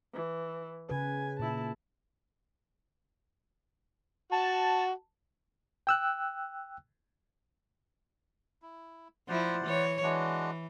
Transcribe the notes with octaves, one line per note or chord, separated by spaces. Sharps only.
E3
C#3 B4 G#5
A#2 E4 A5
F#4 A5
G5 E6 F#6
E4
F3 E4 C5 D5 F#5
E3 C#5
E3 G#3 D4 F#4